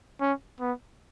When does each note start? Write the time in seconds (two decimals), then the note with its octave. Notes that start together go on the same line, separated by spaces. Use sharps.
0.20 C#4
0.60 B3